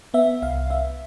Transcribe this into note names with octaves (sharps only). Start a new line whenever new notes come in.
B3 E5
C2 F5
B3 E5